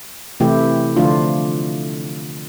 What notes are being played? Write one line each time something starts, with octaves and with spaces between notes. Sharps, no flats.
C3 E3 A3 E4 G4
D3 F3 A3 D4 F4